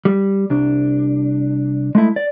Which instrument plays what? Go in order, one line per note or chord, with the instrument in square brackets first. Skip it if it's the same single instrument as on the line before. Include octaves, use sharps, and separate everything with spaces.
[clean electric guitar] G3
C2 D4
G#3 A3 E4
D5